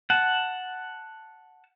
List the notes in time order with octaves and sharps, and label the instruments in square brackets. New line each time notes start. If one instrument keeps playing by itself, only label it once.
[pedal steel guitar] F#5 A5